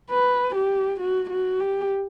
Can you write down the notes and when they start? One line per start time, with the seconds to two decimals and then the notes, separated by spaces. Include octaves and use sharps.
0.11 B4
0.55 G4
1.00 F#4
1.30 F#4
1.60 G4